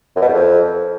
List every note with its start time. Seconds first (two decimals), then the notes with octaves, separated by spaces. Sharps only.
0.16 F#2
0.22 B2
0.28 E2
0.34 F2